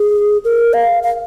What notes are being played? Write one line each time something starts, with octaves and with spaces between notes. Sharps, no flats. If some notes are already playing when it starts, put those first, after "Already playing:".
Already playing: G#4
A#4
F5
F5